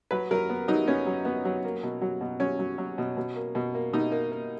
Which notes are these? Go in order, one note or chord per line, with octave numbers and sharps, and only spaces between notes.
F#3 B4
F#3 A#4
B3
F#3 D#4
B3 C#4
F#3
B3
F#3
A#3
B2
F#3
B2
F#3 C#4
F#3
F#3
B2
B2
A#3
B2
A#3
B2 D#4
A#3
A#3